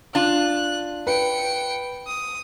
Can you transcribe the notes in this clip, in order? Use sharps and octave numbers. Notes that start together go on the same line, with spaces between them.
D4 F4 F#6
B4 G5 C#7
D#6